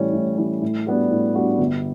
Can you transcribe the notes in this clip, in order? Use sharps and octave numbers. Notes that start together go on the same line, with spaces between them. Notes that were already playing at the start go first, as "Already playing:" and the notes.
Already playing: A2 E3 G3 C#4
A2
E3 G3 C#4
A2
G3 B3 D4 F#4
A2
G3 B3 D4 F#4
G1